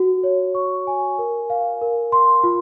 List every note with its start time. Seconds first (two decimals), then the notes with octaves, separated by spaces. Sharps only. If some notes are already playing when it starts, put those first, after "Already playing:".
Already playing: F#4
0.24 C#5
0.55 C#6
0.87 G#5
1.18 A#4
1.50 F5
1.82 A#4
2.12 C6
2.44 F4